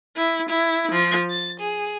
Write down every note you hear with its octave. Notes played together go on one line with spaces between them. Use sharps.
E4
E4
F3
A6
G#4